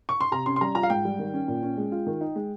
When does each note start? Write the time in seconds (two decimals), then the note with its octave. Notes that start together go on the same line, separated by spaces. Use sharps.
0.09 C#6
0.21 C6
0.31 C3 A#5
0.46 C#4 C6
0.56 C6
0.61 G3 A#5
0.75 F4 A#5
0.83 F5
0.90 G#2 G5
1.05 G3
1.19 D#3
1.34 C#4
1.48 A#2
1.63 C#4
1.77 G#3
1.92 F4
2.07 D#3
2.21 D#4
2.36 G#3